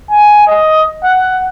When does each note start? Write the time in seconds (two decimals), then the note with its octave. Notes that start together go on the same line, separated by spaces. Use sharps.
0.10 G#5
0.47 D#5
1.04 F#5